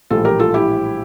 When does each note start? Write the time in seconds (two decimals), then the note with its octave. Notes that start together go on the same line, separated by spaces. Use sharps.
0.10 A#1 A2 E3 G3 F4 A4
0.25 G4 A#4
0.39 F4 A4
0.54 E4 G4